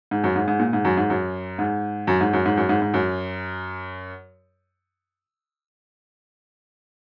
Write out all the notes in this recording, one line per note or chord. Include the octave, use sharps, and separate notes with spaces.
G#2
F#2
G#2
G#2
A#2
G#2
F#2
G#2
F#2
G#2
F#2
G#2
F#2
G#2
F#2
G#2
G#2
F#2